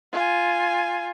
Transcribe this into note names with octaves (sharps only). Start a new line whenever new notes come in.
F4 G#5